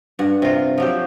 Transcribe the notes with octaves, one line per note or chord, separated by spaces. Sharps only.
G2 F#5
C3 F4
F3 F#3 G4